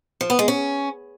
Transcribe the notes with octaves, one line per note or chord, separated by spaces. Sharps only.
F3
B3
G#3
C#4